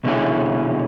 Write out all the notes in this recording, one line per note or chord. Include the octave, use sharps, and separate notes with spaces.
C2 B2 D3 C#4 E4 G#4